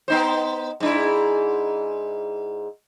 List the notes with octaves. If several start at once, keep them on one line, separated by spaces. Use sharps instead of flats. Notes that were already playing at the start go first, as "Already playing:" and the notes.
B3 D#4 C5
G#2 D4 E4